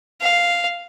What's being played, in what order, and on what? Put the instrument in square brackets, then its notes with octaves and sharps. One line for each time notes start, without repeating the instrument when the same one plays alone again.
[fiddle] F5